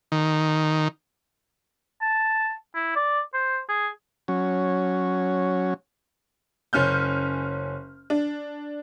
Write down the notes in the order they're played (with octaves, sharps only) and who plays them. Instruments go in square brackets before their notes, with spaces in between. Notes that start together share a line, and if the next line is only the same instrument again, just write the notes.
[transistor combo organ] D#3
[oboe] A5
E4
D5
C5
G#4
[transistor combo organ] F#3 C#4
[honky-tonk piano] F#1 C#4 F6 G6
D4